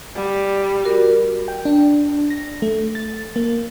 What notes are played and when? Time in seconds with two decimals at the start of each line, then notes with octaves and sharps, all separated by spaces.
0.15 G3
0.84 F#4 A#4
1.48 G5
1.65 D4
2.30 A#6
2.62 A3
2.95 A6
3.36 A#3